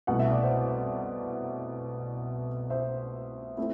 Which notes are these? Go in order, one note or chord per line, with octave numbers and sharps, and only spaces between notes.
C2 B2 A3 E4 F#5
E5
D5
C5 E5
C5 E5
A3 C4 E4